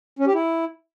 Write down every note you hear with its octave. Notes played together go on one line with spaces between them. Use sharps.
C#4
G4
E4